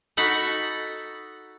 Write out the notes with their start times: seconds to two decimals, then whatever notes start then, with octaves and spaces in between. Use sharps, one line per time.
0.17 D#4 F#4 A4 B5